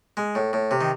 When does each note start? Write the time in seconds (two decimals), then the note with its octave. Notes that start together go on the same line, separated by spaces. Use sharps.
0.17 G#3
0.35 A2
0.53 A2
0.71 C3
0.81 D#3